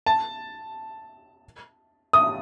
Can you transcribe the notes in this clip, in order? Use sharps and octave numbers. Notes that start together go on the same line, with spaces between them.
A5
D#6